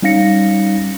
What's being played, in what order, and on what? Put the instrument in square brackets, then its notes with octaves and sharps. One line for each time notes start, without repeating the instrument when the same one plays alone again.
[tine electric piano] G3 C#4 D#4 F5 A#6 C#7